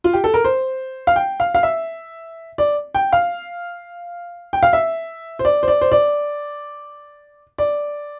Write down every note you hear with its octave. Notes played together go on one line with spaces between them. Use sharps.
F4
G4
A4
A#4
C5
F5
G5
F5
F5
E5
D5
G5
F5
G5
F5
E5
C5
D5
C5
D5
C5
D5
D5